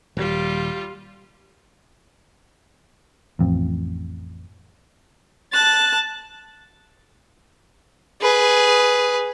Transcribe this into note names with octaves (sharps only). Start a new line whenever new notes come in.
D#1 G3 F4
A1 F2
A5 F#6 A6
G#4 B4